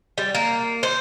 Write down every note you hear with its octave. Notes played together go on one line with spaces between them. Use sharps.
G3
A#3
C5